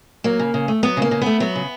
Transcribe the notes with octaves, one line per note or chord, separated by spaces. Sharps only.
F#3 A#3
C#3
C#3
A3
F#3 B3
C#3 A#3
C#3
A3 B3
F#3 B3
C#3